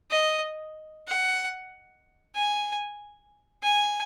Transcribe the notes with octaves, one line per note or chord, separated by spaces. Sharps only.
D#5
F#5
G#5
G#5